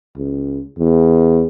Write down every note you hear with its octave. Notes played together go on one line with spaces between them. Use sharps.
C#2
E2